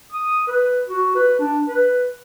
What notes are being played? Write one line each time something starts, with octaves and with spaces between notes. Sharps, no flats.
D#6
B4
F#4
B4
D4
B4